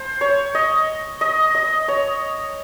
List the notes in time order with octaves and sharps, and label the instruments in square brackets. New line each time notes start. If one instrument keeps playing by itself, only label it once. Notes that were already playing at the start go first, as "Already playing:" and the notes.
Already playing: [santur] C5
C#5
D#5
D#5
D#5
C#5